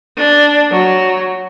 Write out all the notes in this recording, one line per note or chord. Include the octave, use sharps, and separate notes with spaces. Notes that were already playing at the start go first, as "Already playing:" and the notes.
D4
F#3